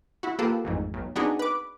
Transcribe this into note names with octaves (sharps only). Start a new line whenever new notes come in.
E4 F#4
A#3 F4 G4 A4 B4
A1 F2 G#2
B1
B3 C4 D4 D#4 F#4 G#4
B4 D6